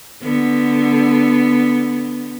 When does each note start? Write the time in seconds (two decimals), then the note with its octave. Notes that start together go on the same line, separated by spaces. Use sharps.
0.21 D3 B3